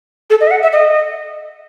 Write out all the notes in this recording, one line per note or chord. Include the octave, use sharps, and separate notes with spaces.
A4
D#5
E5
F#5
E5
D#5